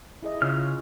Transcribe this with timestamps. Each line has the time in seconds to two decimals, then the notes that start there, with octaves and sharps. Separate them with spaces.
0.23 E4 G#4 D#5
0.42 C#3 F4 C#5 F6